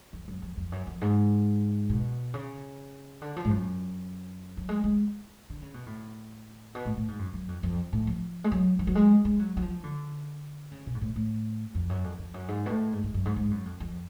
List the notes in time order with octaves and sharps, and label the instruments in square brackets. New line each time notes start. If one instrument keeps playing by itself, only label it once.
[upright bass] F2
F#2
F2
F2
F#2
F2
G#2
B2
C#3
D3
F3
G#2
F#2
F#3
G#3
G#3
D3
C#3
B2
A2
B2
A2
A2
G#2
F#2
F#2
F2
F2
A2
F3
G#3
F#3
F3
F#3
G#3
G#3
F#3
F#3
F3
D3
C#3
B2
G#2
A2
A2
F2
F#2
F2
F2
F#2
G#2
B2
A2
G#2
G#2
F#2
G#2
G#2
F#2
F2
F2